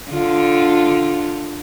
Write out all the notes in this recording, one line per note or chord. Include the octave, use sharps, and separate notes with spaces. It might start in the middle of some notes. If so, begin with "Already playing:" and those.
D3 F4